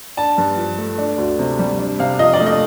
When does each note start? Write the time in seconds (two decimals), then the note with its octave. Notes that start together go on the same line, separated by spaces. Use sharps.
0.17 D4 A5
0.38 G2
0.58 F3
0.78 A3
0.98 D4
1.18 D2
1.39 C3
1.59 G3
1.79 D4
1.99 C3 F5
2.19 F3 D#5
2.34 D5
2.40 A3
2.46 D#5